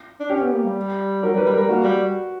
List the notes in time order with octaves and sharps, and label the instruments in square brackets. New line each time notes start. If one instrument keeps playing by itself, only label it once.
[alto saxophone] D4
[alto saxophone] C#4 [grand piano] G4
[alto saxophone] B3
A#3
G3
[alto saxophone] F#3 [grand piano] A#4
[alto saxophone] G3
[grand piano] B4
[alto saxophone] G3
[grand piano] A#4
[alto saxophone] G3
[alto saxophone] A#3 [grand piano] F#4
[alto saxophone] G3